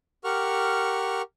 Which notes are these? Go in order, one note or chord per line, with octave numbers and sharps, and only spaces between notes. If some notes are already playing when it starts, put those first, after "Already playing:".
G4 A#4 F#5 C#6 F6